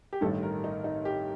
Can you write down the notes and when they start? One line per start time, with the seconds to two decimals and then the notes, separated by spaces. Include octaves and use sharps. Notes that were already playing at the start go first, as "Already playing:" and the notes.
0.13 G4
0.21 A1 G2 D#3 A4
0.43 A#4
0.64 D#4
0.84 D#4
1.05 G4